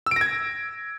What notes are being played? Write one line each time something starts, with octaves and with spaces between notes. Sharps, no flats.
E6 G#6 A#6 D7